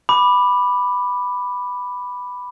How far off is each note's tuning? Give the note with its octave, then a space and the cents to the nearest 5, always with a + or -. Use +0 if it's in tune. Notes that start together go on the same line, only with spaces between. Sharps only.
B5 +0 D6 +10